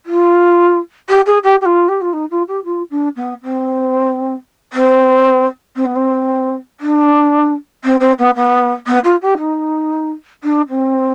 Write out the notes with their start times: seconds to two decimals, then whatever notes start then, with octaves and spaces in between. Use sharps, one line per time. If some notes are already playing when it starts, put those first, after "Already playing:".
0.05 F4
1.08 G4
1.26 G#4
1.43 G4
1.61 G4
1.65 F4
1.88 G4
2.01 F4
2.13 D#4
2.30 F4
2.47 G4
2.64 F4
2.90 D4
3.16 B3
3.43 C4
4.72 C4
5.75 C4
5.85 B3
5.95 C4
6.80 D4
7.84 C4
8.00 C4
8.18 B3
8.35 B3
8.87 B3
9.04 F4
9.21 G4
9.38 D#4
10.43 D4
10.69 C4